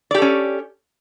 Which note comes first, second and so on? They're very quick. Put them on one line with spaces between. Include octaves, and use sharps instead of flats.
D5 G4 A4 C#4